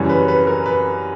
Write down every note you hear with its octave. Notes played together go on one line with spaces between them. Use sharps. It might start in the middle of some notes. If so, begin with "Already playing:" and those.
Already playing: F#2 C#3 E3 G3 C#5
B4
B4
A#4
B4